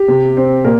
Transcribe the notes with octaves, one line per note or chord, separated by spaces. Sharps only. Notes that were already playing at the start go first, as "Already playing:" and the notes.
Already playing: G4
C3
C4
A#2 A#4